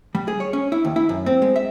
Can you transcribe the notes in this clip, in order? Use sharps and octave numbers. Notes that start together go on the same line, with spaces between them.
G3
G#4
C#5
C#4
E4
D#2
E4
F#2
C4
G#3
E5